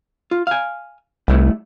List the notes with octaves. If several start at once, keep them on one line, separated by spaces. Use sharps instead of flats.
F4
F5 G#5
C2 G3 A3 E4